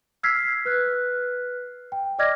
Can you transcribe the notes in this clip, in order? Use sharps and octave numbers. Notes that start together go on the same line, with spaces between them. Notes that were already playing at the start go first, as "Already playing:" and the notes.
E6 F6 G#6 B6 C7
B4 F6 F#6
G5
D5 D#5 D6 F6 G#6 A#6